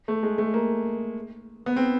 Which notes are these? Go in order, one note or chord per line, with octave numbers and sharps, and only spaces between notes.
A3
G#3
A3
A#3
B3
C4